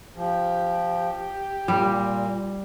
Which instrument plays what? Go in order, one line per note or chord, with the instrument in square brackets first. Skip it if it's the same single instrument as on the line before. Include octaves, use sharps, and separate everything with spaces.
[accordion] F3 [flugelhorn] G4
[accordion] A#2 [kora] G3